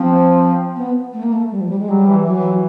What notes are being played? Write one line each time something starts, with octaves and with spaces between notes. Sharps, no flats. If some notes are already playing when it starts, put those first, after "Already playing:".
Already playing: F3 C4
B3
A3
A#3
A3
G3
F3
G3
G#3
F#3 G3
E3
E3 F#3